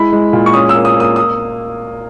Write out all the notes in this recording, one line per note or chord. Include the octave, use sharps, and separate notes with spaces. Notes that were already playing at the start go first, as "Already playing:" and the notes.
Already playing: G#3 E4 B5
G#3
A#2
C#6
C#4 D#6
E6
A#3
D#6
A#3 D#6
D#6